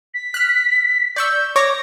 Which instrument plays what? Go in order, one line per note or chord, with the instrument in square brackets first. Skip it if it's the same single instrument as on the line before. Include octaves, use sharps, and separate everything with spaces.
[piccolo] B6
[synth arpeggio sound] F6 F#6
[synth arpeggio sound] D5 C#6 E6 [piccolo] G6
[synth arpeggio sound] C#5 C#6 D6 [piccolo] A#6